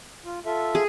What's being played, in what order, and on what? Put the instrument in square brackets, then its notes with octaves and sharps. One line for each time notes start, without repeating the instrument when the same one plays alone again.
[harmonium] F4
F4 A4 E5
[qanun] G#4